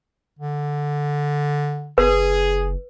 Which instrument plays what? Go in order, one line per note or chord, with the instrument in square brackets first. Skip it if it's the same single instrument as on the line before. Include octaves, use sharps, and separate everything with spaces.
[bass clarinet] D3
[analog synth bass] F#1 [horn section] G#4 [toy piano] B4